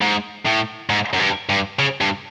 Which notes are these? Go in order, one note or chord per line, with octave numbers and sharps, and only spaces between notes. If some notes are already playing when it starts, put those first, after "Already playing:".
G#2
A2
G#2
F#2
G2
G2
C#3
G2